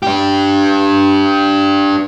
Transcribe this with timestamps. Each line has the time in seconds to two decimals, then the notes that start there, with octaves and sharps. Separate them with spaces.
0.03 D4 G4